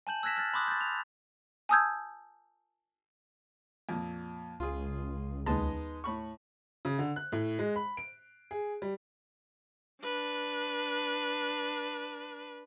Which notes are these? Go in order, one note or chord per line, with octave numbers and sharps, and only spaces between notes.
G#5 A5 G6 F#7
E6 F#6 G#6 A#6 B6 E7
F6 F#6 A6
B5 C6 D6 D#6 F#6
G6 A6
F7
G#5 A5 D#6 E6 G6 G#6
F2 A#2
C#2 F4 G#4
D#2 G#3 B3 D#4 A5
A2 B5 C#6
C#3
D3
F#6
A2
G#3
B5
D7
G#4
G3
D4 B4